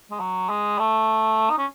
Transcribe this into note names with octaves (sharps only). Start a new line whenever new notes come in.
G#3
F#3
G#3
A3
D#4
C#4